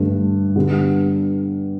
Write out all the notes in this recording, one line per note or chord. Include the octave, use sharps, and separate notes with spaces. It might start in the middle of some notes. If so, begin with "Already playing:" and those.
Already playing: G2 D3 A3
D3 G3 B3